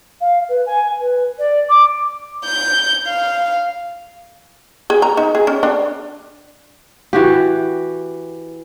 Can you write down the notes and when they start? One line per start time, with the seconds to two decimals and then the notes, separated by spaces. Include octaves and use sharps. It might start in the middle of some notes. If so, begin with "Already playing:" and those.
0.21 F5
0.49 B4
0.66 G#5
1.00 B4
1.38 D5
1.69 D6
2.46 G6
3.07 F5
4.90 G#4
5.02 A#5
5.17 D#4
5.35 G#4
5.47 C#4
5.63 D4
7.13 E3 F#4 G4